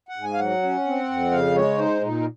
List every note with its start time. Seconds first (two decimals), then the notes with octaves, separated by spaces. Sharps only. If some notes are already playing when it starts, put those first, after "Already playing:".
0.09 F#5
0.16 G#2
0.24 G#5
0.33 F5
0.39 F#3 F#5
0.63 C#4
0.86 C4
1.08 F2
1.31 C#3 F5
1.55 G#3 C#5
1.78 D#4 C5
2.02 A#2 D#4
2.20 A#4